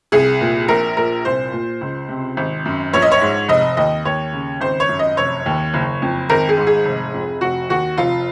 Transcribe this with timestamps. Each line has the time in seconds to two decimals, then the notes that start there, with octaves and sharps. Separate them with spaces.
0.12 C2 G#4
0.41 A#2
0.68 A#1 A#4
0.97 A#2 A#4
1.25 C2 C5
1.52 A#2
1.81 C#2
2.09 C3
2.37 G#1
2.65 F#2
2.93 A#1 C#5
3.02 D#5
3.11 C#5
3.21 G#2
3.48 F1 D#5
3.77 D#2 D#5
4.05 D#2 C#5
4.33 C#3
4.61 G#1 C5
4.80 C#5
4.89 F#2
4.99 D#5
5.17 F1 C#5
5.46 D#2
5.74 F#1
6.02 F2
6.29 G#1 A#4
6.49 G#4
6.57 G#2
6.67 G#4
6.85 F1
7.14 F2
7.41 F1 F#4
7.69 D#2 F#4
7.98 F1 F4